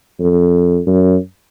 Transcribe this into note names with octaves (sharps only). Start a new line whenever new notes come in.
F2
F#2